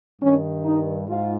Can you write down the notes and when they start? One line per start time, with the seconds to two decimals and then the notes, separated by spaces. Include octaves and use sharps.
0.21 G2 D#3 C#4
0.65 D#4
1.08 G#2 F4